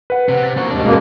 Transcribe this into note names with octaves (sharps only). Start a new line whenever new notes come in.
B4 F#5
C3
A6
A#3 F#4
D#2 G#2 D4
F#2 B2 G#3 A#3